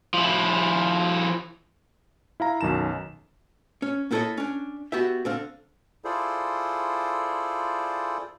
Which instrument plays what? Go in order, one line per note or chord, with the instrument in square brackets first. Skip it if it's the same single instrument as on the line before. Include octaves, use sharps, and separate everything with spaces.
[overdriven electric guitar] F3 E4
[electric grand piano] E4 F5 A#5
B1 F#2 D#3 A5 E7
[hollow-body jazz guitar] C#4
A#3 B3 E4 A4 C#5 D#5
C#4 D4
B3 F#4 G4 E5
D3 C4 F5
[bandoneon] E4 F4 G#4 A4 C5 D5